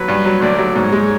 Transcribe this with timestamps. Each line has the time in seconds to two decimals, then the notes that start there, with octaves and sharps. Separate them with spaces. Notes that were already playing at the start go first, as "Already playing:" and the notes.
Already playing: F#3 B4
0.08 G2
0.25 F#3
0.41 D2 D5
0.59 F#3
0.75 G#2 C#5
0.93 G#3